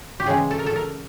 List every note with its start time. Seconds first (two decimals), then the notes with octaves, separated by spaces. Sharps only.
0.20 G4
0.26 C#3 E3 G#3 G#4
0.51 A4
0.59 A#4
0.66 A4
0.76 A#4